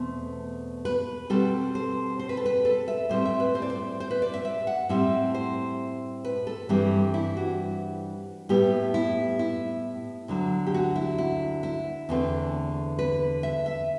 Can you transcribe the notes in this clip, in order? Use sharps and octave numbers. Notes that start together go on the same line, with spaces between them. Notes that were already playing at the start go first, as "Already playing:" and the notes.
Already playing: E2 B2 A3 C4 C5
B4
B2 G3 C4 A4
C5
C5
B4
A4
B4
A4
E5
A2 G3 C4 C5
E5
B4
C5
D5
C5
C5
B4
D5
E5
E5
F#5
A2 G3 C4 E5
C5
B4
A4
G2 E3 G3 C4 G4
E4
F#4
A2 G3 B3 G4
E4
E4
D2 D3 F#3
G4
F#4
E4
E4
E4
E2 D3 A3 C4
B4
E5
E5